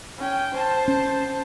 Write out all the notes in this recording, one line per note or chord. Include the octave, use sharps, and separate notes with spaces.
C#4 G5
C5 A5
C#4